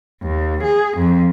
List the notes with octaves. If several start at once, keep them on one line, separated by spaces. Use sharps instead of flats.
D#2
G#4
F2